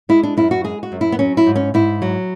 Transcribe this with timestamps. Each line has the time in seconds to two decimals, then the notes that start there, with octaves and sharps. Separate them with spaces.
0.09 G#3 E4
0.23 D4
0.37 F#2 E4
0.51 F#4
0.64 G#3 G#4
0.83 F#4
0.92 F#2
1.01 E4
1.12 B3
1.19 F#3 C#4
1.37 E4
1.47 G#2
1.56 C#4
1.74 G#2 E4
2.02 F#3